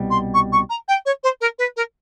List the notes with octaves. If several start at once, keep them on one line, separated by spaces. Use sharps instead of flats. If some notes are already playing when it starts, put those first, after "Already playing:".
Already playing: C2 B2 G3
C6
C#6
C#6
A#5
G5
C#5
C5
A#4
B4
A#4